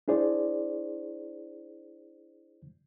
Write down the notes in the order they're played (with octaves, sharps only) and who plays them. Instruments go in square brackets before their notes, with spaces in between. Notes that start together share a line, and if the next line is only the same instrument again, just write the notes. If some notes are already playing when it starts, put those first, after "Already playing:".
[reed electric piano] D4 E4 G#4 C5 D5